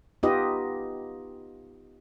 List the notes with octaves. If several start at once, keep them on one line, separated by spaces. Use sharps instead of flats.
B3 D#4 F4 G4 B4 D#5